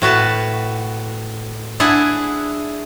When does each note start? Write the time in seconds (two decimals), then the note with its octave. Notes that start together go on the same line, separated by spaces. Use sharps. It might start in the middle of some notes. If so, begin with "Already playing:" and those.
0.02 A2 F#4 B4 A5
1.80 D4 E4 G#4 F#5